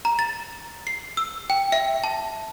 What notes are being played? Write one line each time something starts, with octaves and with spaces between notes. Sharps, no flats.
A#5
A6
C7
E6
G5
E5
A5